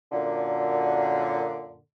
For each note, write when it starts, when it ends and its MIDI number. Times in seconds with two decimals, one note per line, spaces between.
0.12 1.79 42
0.12 1.79 46
0.12 1.79 50